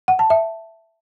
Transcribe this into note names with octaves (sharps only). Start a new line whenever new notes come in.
F#5
A5
E5